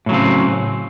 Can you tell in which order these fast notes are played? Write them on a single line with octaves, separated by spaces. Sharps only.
A2 F#3 C#3 C4